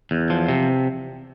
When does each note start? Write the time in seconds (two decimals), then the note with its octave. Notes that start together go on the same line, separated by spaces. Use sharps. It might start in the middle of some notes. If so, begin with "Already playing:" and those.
0.11 E2
0.30 F3
0.49 C3